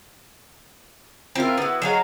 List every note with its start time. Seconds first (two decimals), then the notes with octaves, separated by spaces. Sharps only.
1.35 C4 E4 F4 A#4
1.58 B3 E4 F#4
1.82 F#3 G#4 C#5 D#5 F5